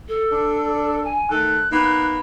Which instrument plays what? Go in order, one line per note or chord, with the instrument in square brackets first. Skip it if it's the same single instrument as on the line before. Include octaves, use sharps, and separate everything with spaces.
[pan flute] A4
[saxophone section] D4
[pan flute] G#5
[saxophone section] D#3 A3 A4 [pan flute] F#6
[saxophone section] A#3 B3 D#4